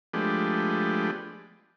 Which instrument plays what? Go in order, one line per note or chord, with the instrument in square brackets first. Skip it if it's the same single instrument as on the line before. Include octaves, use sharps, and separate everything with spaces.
[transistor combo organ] F3 G#3 A3 B3 D4 G4